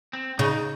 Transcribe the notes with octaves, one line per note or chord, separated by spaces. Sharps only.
C4
C#3 D#4